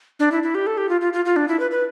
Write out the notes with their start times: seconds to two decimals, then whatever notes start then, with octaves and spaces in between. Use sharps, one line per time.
0.20 D4
0.32 E4
0.43 E4
0.55 G4
0.67 A4
0.77 G4
0.89 F4
1.01 F4
1.13 F4
1.25 F4
1.36 D4
1.48 E4
1.60 B4
1.71 B4